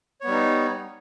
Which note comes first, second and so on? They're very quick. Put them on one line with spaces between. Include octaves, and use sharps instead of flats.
C#5 B3 G3 D#4